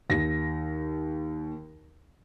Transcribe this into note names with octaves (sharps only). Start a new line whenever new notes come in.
D#2 A#6